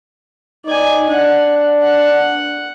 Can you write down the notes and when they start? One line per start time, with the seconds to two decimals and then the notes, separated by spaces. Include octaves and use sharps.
0.66 D#4 D5 G#5
1.09 D4 F#5
1.83 F#5